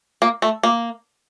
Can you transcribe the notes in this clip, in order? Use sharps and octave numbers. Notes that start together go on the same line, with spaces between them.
A#3
A3
A#3